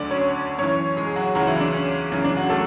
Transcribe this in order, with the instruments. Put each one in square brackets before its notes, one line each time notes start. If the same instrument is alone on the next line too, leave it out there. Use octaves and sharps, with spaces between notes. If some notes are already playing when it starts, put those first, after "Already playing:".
Already playing: [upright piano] D2 D3 F#3 D4 D5
C#4 C#5
F#2 E3 C#4 C#5
G#3 G#4
F#3 F#4
C#2 C#3 E3 F#3 F#4
E3 E4
D4
C#4
F#2 C#3 E3 C#4
D4
F#3 F#4
A3 A4